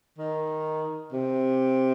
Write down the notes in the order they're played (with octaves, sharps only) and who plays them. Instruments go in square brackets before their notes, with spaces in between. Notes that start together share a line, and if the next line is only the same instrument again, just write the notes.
[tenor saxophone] D#3
C3